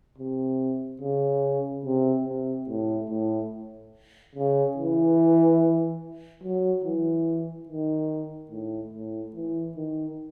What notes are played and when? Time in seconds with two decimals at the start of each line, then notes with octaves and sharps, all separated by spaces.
0.18 C3
1.01 C#3
1.85 C3
2.26 C3
2.68 A2
3.10 A2
4.35 C#3
4.77 E3
6.43 F#3
6.84 E3
7.68 D#3
8.51 A2
8.93 A2
9.35 E3
9.76 D#3